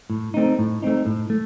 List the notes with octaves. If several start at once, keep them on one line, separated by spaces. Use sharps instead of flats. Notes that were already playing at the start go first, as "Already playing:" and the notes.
A2
A3 C4 D#4
A2
A3 C4 D#4
A2
A3